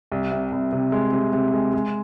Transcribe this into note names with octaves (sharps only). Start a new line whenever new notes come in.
C2
C3
C2
C3
G#3
C3
C3
G#3
G#3